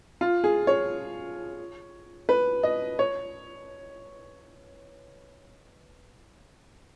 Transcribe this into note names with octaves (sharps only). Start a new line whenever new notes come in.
F4
G#4
C#5
B4
D#5
C#5